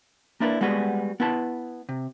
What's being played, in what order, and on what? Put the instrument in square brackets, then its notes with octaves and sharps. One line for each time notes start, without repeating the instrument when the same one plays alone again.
[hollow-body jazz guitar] A#3 D4 E4 A#4 B4 D5
G3 G#3 B3 F#4 G#4 B4
B3 E4 B4 A5
C3